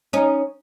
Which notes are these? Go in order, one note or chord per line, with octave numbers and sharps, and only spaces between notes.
C#4 D#4